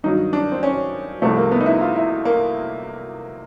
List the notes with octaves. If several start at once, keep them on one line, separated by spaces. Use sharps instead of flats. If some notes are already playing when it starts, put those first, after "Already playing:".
G2 D#3 F#3 D#4
D4
C4
C#4
C2 C3 F3 A3
A#3
B3
D#4
E4
F4
E4
A#3